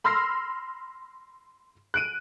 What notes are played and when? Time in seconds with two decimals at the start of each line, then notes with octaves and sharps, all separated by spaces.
0.04 B5 C6 E6 F6 A#6 C7
1.94 F#6 D7 D#7